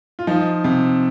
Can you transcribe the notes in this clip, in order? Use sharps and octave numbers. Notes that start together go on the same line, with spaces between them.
F4
F3 D#4
C3